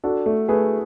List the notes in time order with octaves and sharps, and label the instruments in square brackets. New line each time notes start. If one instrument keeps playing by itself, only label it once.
[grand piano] D4 [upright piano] F#4 A4
[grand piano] A3
[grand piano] A3 [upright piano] G#4 B4